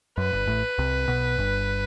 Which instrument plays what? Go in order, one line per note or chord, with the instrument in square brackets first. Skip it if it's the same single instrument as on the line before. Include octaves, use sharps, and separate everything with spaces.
[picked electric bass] F#2 [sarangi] B4
[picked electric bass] G1 G2
A1 A2
C2 C3
B1 B2
G1 G2